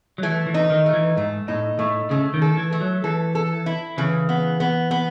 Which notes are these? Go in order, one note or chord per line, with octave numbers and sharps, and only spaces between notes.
F#3
E3 A3
E3
D#4
D#3
A3
E3
G#2 A3
A2 D#4
A2 A3
C#3 A3
D#3
A4
E3
A3
F#3
E3 A4
A4
E4
C#3 E3
B3
B3
B3